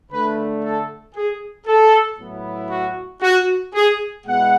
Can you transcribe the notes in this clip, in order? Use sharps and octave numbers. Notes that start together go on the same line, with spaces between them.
D3 A3 D4 B4
A4
G#4
A4
A2 F#3 B3 E4
F#4
F#4
G#4
B2 G#3 B3 E4 F#5